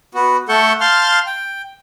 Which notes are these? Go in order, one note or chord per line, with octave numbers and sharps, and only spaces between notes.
B3 F#4
A3 A4 F#5 C#6 G6
F5 A5 C6 F6 G6
G5